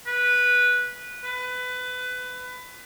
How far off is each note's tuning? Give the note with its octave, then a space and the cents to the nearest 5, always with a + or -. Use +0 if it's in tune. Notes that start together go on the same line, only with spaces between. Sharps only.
B4 -10
B4 +20